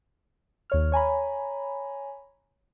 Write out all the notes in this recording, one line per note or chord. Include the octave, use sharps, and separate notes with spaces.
D#2 C#5 F6
C#5 G#5 A#5 B5